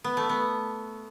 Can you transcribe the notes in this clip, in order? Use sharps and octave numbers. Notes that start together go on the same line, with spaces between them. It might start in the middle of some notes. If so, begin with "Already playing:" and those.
B3
A3
B3